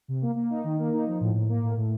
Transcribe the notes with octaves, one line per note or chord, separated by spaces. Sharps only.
C3
A#3
A#3
D#4
D#3
A#3
D#4
F3
A2
A2
A#3
A2
A2